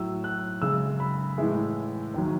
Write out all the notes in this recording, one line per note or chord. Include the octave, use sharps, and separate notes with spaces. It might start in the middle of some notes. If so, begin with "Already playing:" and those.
Already playing: A2 F#3 E6
F#6
F#2 C#3 G#3 E6
B5
A2 E3 G#3 E5
D#2 D#3 F#3